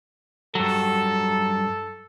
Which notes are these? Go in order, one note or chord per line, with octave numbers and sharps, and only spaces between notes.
G2 F#3 A4